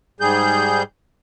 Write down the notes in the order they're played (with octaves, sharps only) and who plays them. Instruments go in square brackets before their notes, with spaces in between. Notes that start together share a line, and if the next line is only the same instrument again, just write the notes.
[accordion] G#2 G3 G#4 G6